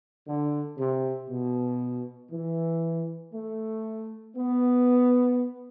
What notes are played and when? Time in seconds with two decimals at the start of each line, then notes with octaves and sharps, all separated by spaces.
0.27 D3
0.77 C3
1.29 B2
2.31 E3
3.33 A3
4.36 B3